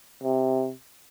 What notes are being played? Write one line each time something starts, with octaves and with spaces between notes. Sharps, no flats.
C3